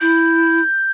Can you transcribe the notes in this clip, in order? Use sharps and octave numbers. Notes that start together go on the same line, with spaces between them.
E4 G6